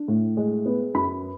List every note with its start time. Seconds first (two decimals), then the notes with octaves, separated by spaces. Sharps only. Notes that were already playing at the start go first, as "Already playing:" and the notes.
Already playing: D4
0.08 A2
0.37 G#3
0.66 B3
0.94 F#2 B5